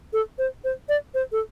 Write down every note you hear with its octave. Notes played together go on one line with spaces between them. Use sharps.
A4
C5
C5
D5
C5
A4